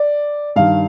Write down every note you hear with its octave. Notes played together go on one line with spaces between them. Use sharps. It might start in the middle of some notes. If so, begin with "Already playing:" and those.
Already playing: D5
G2 D#3 F5